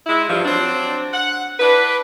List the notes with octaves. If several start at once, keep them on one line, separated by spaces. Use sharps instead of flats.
G#3 E4
G2 F3
F#3 C4 D4
F#5
D4 E4 B4